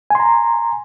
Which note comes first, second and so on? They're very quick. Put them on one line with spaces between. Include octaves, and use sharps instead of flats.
G#5 C6 A#5